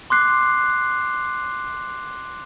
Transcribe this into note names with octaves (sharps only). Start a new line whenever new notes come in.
C6 D6 F#6 C7